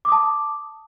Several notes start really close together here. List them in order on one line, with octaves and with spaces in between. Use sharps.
D6 D#6 A5